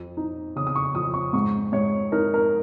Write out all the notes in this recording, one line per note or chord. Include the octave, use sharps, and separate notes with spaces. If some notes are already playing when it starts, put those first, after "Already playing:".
Already playing: F2
D#4
C#3 D#6
D#6
C#6
F2 D#6
C#6
G#2 C#6
G#2 C#5
D#4 A#4
A#4